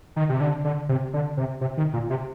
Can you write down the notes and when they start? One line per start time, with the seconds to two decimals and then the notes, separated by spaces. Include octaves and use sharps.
0.16 D#3
0.29 C3
0.40 D3
0.65 D3
0.89 C3
1.14 D3
1.37 C3
1.61 C3
1.77 D#3
1.93 A#2
2.10 C3